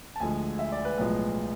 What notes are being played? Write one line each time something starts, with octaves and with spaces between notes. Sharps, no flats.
A5
D2 D3 F3 G#3 G#5
E5
D5
B4
B1 A2 F3 G#3